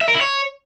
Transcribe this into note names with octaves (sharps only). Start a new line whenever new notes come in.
E5
A#4
E4
C#5